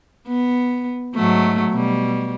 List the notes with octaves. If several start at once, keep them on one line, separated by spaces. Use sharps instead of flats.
B3
G#2 F#3 A3
B2 G3